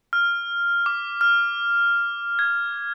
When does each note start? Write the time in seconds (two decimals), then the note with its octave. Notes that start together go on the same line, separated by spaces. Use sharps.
0.13 F6
0.86 D6
1.21 F6
2.39 G#6